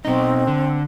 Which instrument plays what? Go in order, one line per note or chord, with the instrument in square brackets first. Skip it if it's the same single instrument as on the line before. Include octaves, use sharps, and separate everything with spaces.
[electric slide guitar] B2 D#4 [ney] C4
[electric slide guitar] D3